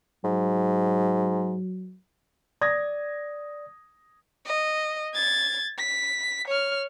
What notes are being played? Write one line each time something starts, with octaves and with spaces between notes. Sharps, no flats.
G#2 F#3
D5 D#6 G#6 A#6
D#5
G#6 A6
B6
C#5 F6